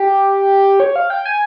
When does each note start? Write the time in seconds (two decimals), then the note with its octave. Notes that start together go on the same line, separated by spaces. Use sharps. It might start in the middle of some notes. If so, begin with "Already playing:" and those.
Already playing: G4
0.80 C#5
0.96 F5
1.10 G5
1.25 G#5